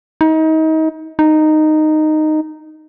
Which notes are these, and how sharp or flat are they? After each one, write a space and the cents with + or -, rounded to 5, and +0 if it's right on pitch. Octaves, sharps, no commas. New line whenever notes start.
D#4 +30
D#4 -10